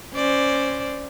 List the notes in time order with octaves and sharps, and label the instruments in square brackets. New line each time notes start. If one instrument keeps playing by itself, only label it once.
[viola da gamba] C#4 C5 D5